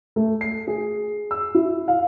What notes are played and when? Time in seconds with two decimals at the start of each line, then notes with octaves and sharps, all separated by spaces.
0.16 A3
0.41 C7
0.68 G#4
1.31 E6
1.55 E4
1.88 F5